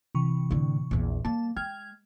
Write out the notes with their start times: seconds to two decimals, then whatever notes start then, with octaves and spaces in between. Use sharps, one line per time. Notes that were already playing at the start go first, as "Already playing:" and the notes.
0.15 C3 E3 C#6
0.51 A2 D3
0.91 A#1 E2
1.25 G3 A#3 A5
1.56 G#3 G5 F6 G#6